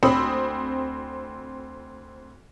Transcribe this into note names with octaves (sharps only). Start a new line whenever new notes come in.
D2 C4 B5 D#6 E6